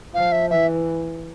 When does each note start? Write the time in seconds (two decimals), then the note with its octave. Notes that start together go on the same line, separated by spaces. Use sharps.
0.14 F3 F5
0.32 E5
0.50 E3 E5